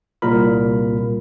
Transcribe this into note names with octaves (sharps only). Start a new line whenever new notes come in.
C2 A#2 A#4 B5